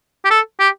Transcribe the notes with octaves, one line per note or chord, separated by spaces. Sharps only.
G4
A4
G4